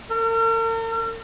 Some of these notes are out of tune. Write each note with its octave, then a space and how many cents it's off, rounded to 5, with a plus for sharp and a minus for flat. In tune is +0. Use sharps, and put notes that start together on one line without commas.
A#4 -45